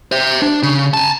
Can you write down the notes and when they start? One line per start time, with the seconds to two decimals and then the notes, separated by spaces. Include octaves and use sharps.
0.12 C5 E5
0.42 D4
0.63 C#3
0.94 G#5 A5